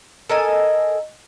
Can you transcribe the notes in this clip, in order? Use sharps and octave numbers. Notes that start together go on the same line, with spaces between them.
A4 A#4 D#5 G#5